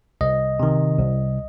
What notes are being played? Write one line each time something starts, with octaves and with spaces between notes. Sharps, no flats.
C2 D#5
C3 D#3
C2